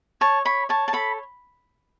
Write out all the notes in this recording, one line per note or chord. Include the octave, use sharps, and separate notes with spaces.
C#5 A5
C#5 B5
C#5 A5
A5
A4 B5